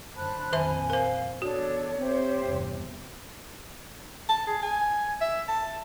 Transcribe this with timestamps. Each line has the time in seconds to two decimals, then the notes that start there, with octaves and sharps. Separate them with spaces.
0.16 F#2 D3 C5 A5 B5 F#6
0.52 A#1 F2 D#3 C5 E5 G#5
0.90 A#4 C5 F5
1.42 E2 D4 F#4 A4 C#5
2.00 C4 G4 C5 E5
2.46 E2 G2 C3
4.29 A5
4.47 G#4
4.63 G#5
5.21 E5
5.48 A5